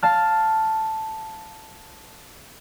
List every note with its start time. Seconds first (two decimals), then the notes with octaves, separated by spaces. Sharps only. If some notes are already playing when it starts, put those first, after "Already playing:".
0.03 F5 A5 F6